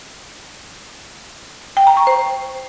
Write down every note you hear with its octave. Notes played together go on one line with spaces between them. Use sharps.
G5
A#5
C#6
C5